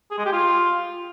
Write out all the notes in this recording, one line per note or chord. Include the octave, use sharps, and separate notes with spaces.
G#4
G#3
G4
F4